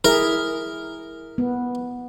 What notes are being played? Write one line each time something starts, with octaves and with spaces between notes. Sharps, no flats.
E4 G#4 A#4 E5
B3